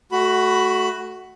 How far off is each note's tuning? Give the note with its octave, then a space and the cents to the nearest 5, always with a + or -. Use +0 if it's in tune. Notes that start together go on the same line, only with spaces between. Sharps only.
A3 -5 F#4 +15 B5 +10